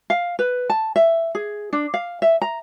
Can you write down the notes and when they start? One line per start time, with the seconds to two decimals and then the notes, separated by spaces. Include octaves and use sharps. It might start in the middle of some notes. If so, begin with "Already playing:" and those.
0.10 F5
0.39 B4
0.70 A5
0.96 E5
1.35 G#4
1.73 D4
1.94 F5
2.22 E5
2.42 A#5